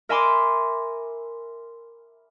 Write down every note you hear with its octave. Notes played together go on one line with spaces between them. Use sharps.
A#4 E5 G#5 B5 C6 D6